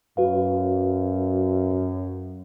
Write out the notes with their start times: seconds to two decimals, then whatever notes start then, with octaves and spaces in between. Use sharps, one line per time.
0.17 F#2 F#4 B4 F5